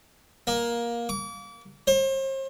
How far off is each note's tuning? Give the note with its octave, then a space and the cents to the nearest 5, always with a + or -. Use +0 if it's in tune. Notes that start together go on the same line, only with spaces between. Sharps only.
A#3 +15
D6 -35
C5 +40